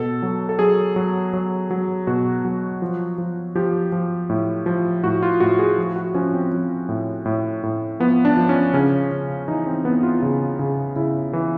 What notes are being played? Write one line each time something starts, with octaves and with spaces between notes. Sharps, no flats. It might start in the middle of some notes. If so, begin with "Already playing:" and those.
Already playing: B2 A4
F#3
A4
F#3 G#4
F#3
F#3
F#3
B2 F#4
F#3
F3
F3
F3 G4
F3
A2
F3
A2 F#4
F4
A2 F#4
G#4
F3
F#4
F3 C#4
C4
F3
A2
A2
A2
F3 B3
D4
F3
C#4
C#3 C#4
C#3
E3 D#4
C4
E3 B3
F4
C#3 F4
C#3
C#3 E4
E3